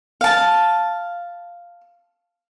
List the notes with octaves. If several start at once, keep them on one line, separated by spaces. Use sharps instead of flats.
F5 A5